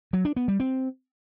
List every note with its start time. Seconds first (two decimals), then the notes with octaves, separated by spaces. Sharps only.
0.13 F#3
0.25 D4
0.36 B3
0.48 G3
0.60 C4